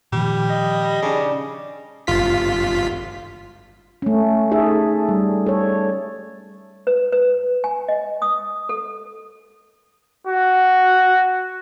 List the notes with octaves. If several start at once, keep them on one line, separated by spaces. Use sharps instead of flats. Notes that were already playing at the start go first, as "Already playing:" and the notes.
A#2 D#3 F3 G3
D#5
C#3 D4 D#4
G1 F4 B6
A3 C#4
D#4 G#4 A4 E5
G3
A4 C#5
B4
B4
G#5
D#5
D#6
A4
F#4